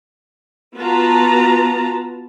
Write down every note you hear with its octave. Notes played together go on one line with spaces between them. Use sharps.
B3 F4 F#4 B4 A5 A#5